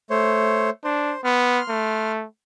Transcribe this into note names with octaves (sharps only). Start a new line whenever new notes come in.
A3 C5 C#5
D4 C5
B3 C6 F6
A3